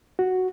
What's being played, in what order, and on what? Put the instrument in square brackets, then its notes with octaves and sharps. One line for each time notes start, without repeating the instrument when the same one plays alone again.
[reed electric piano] F#4